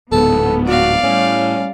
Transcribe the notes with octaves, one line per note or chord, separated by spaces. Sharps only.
D1 G#2 B3 A4
F#4 D5 F5
A2 G3 C#4